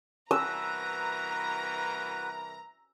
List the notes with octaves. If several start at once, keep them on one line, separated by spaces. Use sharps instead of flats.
C2 E3 F#4 A#4 B4 A#5 E6